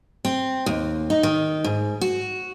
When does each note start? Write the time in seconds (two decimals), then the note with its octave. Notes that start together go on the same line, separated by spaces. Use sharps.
0.25 C4
0.66 D#2
1.10 D#4
1.23 D#3
1.64 G#2
2.01 F#4